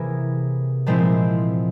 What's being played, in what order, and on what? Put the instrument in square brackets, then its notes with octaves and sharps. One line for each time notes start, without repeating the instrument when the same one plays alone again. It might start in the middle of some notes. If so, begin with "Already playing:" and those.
Already playing: [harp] C3 E3 A#3 E4 G#4
A#2 F3 G#3 C4 E4